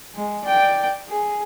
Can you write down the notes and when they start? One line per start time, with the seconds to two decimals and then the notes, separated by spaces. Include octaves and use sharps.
0.15 G#3
0.44 D5 G5
1.09 G#4